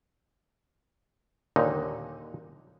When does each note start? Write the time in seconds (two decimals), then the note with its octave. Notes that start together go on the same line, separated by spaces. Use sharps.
1.56 D#2 A#2 D3 D#4